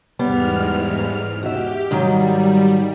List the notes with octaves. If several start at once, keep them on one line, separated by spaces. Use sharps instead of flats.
E2 G#2 G3 B3 F6
F#4 G4 E5
G#2 D#3 F#3 G3